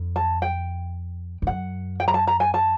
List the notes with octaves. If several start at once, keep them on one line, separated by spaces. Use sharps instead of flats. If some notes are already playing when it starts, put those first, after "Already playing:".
Already playing: F2
A5
G5
F2
F#2 F#5
G5
A#5
A5
A#5
G#5
A5